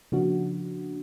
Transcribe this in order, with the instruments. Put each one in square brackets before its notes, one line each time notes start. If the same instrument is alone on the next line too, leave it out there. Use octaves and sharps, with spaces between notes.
[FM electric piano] C#3 F3 A#3 D4 F#4